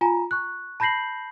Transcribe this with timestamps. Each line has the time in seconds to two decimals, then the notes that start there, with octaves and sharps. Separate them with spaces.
0.01 F4 G#5 A#5
0.31 C#6 F#6
0.80 A5 B5 G6 A#6 C7 F#7